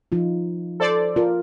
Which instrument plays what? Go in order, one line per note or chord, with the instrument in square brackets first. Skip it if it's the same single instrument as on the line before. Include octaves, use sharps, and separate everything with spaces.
[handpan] F3 D#4 F4
[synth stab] A4 C5 D5
[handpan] F4 A#4